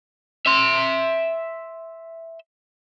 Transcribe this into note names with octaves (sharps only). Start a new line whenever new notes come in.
E5 C6